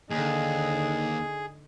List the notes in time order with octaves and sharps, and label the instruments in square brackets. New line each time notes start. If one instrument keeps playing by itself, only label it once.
[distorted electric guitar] D#2 [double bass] D3 D#4 [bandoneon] G#4